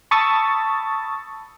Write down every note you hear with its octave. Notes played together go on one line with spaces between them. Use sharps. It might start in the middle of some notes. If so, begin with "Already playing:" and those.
A5 B5 C#6 D#6 E6 A6